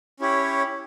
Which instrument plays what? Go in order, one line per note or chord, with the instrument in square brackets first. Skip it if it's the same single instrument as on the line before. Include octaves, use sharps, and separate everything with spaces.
[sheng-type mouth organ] C#4 E4 G4 C#5